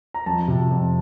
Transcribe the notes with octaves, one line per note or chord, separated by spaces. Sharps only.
A#5
F2 A5
C3
F2